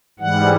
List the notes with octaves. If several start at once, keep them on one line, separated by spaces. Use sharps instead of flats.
G#2 E3 G3 F#5